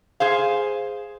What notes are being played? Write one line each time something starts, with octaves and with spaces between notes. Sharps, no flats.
G#4 C5 F5